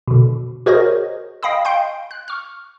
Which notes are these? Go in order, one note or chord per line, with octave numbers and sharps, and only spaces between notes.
B2 D3
F#4 G#4 A#4 C5 C#5 D#5
D#5 F5 G5 B5 D#6
F5 G5 C6 G6
F#6
C#6 F6